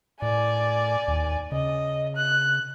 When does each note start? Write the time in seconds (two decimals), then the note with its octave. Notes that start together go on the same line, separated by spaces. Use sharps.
0.22 A2 D5 G#5
1.08 D#2
1.52 C#3 D#5
2.16 F#6